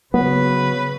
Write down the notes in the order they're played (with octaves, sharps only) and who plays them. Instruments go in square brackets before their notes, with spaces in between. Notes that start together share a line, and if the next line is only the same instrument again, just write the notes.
[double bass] C#3 [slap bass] F#3 [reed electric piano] B3 [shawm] B4